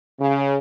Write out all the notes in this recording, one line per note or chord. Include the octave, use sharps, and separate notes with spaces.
C#3